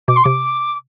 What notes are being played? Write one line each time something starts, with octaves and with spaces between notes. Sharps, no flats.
B2 D6
C6
C3 D6